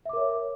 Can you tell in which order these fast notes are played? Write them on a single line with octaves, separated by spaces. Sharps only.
E5 D6 A#4 C#5